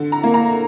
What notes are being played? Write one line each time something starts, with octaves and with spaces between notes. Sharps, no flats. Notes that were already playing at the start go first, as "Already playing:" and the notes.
Already playing: D3
A#5
A#3
A#5